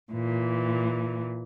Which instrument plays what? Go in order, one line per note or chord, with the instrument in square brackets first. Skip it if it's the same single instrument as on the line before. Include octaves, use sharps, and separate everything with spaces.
[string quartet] A#2 E3